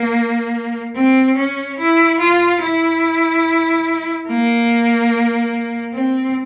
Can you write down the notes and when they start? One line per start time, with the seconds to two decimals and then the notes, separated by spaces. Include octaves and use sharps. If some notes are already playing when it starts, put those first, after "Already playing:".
Already playing: A#3
0.95 C4
1.37 C#4
1.78 E4
2.20 F4
2.61 E4
4.28 A#3
5.94 C4